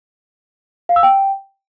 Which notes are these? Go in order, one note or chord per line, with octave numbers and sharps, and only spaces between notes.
F5
E6
G5